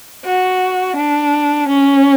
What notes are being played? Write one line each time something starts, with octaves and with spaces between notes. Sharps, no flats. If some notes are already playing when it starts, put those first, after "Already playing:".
F#4
D4
C#4